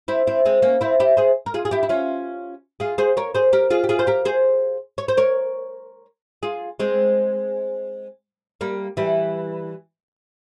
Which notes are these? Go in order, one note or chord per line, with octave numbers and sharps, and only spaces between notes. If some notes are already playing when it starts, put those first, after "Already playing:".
C4 E4
C4 E4
G#3 C4
A#3 C#4
C4 E4
E4 G4
G#4 C5
A#4
F4 G#4
G#4
E4 G4
E4
C#4 F4
F4 G#4
G#4 C5
A#4 C#5
G#4 C5
G4 A#4
F4 G#4
G4
F4 G#4
C5
G4 A#4
G#4 C5
C#5
C5
A#4 C#5
F4 G#4
G#3 C4
G3 A#3
E3 G3